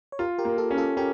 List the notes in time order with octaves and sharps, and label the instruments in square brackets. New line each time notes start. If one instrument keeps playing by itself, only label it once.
[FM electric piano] C#5
[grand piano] F4 [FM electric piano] G4 A#4
[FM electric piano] G4 A#4
[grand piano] A#3
[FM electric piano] F4 A4
[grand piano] C#4
[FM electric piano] F4 A4
[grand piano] C#4 [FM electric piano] G4 A#4